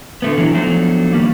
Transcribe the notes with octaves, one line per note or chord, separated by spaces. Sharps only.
D3 A3 B3
D3 E3 F#3 E4
F3 F#3 A3 B3 D4 D#4
D#3 F3 G3 A#3